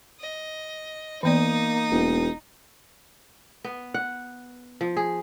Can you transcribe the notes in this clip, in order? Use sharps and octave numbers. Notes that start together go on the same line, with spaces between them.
D#5
E3 A#3 B3 D#4 D5 D#6
E1
B3
F#5
F3
G#4